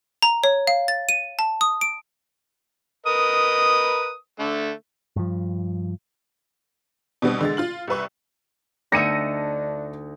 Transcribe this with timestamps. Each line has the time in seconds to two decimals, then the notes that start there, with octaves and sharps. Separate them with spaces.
0.22 A#5
0.44 C#5
0.67 F5
0.88 A6
1.09 D#7
1.39 A5
1.61 D#6
1.81 D7
3.06 A#4 B4 D#5 D#6
4.39 D3 A3
5.16 G2 F3
7.22 B2 D3 G3 B3 C4
7.41 D3 G#3 A6
7.57 F4 F6 F#7
7.87 C2 C3 B4 C#6
8.92 D2 D4 D#4 E5 A#6 C#7 D#7